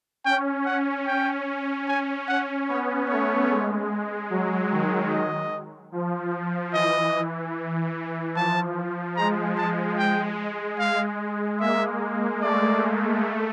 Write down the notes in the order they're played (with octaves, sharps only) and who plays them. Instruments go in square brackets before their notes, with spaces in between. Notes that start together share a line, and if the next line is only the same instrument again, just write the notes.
[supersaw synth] C#4 [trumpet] G5
[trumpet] F#5
[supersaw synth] C#4 [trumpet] G5
[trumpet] G#5
F#5
[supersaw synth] B3 [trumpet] C#5
[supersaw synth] A3 [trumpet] C#5
[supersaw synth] G#3
F#3
D#3
[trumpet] D#5
[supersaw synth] F3
[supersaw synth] E3 [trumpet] D#5
[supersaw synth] F3 [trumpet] A5
[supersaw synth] G#3 [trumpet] A#5
[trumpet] A5
G5
F5
[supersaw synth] A#3 [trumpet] E5
[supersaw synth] A3 [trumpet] D5
[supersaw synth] G#3
A3